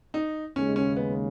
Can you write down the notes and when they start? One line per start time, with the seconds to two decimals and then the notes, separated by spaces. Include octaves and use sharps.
0.14 D#4
0.56 D#2 C#3 G#3 C#4
0.76 C#4
0.96 B3